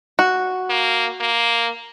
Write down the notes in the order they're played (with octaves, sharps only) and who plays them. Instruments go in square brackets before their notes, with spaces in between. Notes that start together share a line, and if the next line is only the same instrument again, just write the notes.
[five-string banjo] F#4
[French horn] A#3
A#3